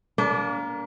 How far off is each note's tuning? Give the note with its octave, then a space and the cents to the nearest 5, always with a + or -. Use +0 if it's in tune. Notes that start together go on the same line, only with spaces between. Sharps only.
A#3 +15 D4 -35